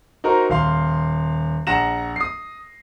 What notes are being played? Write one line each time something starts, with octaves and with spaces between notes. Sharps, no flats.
D#4 F#4 A#4 C5 A#5
D#1 F5 C6
A#1 F#5 A#5 A#6 E7
D#6 C7